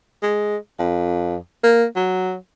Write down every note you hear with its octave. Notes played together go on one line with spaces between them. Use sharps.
G#3
F2
A#3
F#3